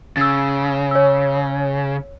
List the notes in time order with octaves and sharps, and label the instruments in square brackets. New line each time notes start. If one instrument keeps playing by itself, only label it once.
[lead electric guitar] C#3 [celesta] E6 A6
[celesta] C#5 E6